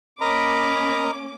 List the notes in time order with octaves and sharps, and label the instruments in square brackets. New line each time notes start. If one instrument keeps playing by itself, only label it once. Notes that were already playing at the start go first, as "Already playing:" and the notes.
[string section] A#3 C#4 D6 [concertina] A#4 D#5 A#5 [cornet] B5